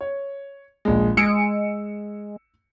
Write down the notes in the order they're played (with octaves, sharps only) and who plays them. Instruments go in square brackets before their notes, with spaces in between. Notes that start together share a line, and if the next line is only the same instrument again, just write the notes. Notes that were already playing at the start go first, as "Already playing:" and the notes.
[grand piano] C#5
A#1 G#3
[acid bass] G#3 [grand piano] E6 C#7 D7